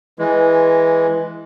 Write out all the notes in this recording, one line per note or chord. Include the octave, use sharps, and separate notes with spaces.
E3 G#3